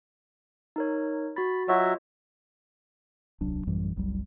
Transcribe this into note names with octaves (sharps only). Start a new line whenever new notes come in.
D#4 A#4 C#5
F#4 B5 A6
F#3 F4 F#4 C#5 D#5 E5
D#1 C2 F#3 D4
A1 F#2 E3 G3
F#1 C2 F#3 G3